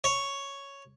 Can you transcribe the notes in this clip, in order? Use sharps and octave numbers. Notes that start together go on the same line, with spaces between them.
C#5